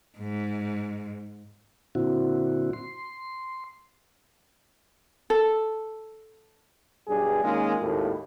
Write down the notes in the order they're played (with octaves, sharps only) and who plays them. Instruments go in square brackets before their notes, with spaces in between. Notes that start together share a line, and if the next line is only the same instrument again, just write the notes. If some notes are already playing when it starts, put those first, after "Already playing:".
[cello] G#2
[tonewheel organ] A#2 D3 C4 E4 F#4
C6
[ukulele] A4
[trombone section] B1 G2 G3 D4 G#4
D#3 G#3 A#3 C#4 D#4 F4
G#1 D#2 A2